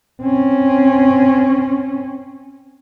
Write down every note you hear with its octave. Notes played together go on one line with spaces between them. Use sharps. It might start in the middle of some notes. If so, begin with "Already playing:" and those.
C4 C#4